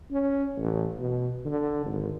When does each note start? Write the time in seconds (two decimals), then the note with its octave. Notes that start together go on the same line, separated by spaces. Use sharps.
0.11 C#4
0.57 A1
0.99 B2
1.45 D3
1.85 G#1